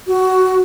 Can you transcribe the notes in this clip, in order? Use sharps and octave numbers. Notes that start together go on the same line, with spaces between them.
F#4